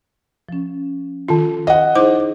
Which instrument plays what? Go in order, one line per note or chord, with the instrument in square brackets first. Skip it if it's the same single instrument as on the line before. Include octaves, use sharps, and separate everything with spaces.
[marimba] F3 C#4
[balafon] D#3 F4
[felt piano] D#5 F#5
[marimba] D#4 G#4 [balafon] E4 C5 D6